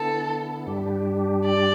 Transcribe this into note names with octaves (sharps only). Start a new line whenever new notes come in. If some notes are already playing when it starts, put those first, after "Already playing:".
Already playing: D3 B3 E4 A4
G2 G3 D4 G4
D5